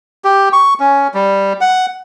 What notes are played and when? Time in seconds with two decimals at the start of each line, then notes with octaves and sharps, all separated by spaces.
0.24 G4
0.53 C#6
0.80 C#4
1.14 G3
1.61 F#5